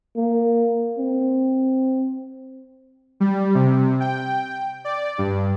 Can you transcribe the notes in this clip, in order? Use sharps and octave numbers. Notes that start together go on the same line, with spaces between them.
A#3
C4
G3
C3
G5
D5
G2